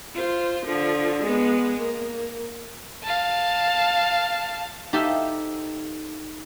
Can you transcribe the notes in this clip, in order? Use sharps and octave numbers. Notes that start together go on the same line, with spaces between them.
F4 C5
D3 F3
G#3 B3
A#3
F5 A5
D#4 G4 A4 C5 E5 F5